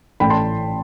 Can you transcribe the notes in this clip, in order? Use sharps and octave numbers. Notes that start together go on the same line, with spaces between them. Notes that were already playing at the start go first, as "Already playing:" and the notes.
A1 A2 E3 G5 B5
A5 C6